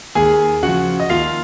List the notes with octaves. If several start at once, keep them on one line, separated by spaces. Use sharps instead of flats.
D#2 G#4 G#5
C#3 F3 F#4 F#5
D#5
D#2 F4 F5